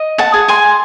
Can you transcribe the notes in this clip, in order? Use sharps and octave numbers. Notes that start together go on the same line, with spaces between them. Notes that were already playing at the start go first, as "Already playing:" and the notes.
Already playing: D#5
F#5 A5
G#4
G#5 C6